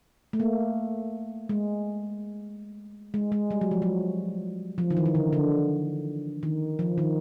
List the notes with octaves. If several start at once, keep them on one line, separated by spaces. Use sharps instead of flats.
A3
A#3
G#3
G#3
G#3
G3
F#3
F3
F#3
F3
D#3
E3
D#3
D3
D3
D#3
F3
D#3